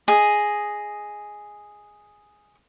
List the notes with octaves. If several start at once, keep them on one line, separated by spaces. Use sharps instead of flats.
G#4 D#5